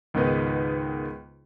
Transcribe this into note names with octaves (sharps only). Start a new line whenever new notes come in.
C#2 G#2 D#3 B3 D#4 B4